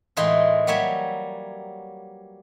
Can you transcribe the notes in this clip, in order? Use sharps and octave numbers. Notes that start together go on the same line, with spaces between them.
A2 E3 G#3 D#4 F4 A#4
F#3 G3 A#3 C#5 E5